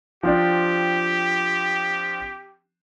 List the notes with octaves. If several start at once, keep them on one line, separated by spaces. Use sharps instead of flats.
F3 C4 D4 G4